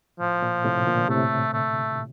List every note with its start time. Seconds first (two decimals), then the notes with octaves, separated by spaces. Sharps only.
0.20 A2 F3
0.42 A#2
0.64 A2 C3
0.87 A#2 D3
1.09 A2 C3 A3
1.54 A3